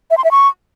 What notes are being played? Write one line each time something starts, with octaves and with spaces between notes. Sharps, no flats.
E5
C6
E5
C#6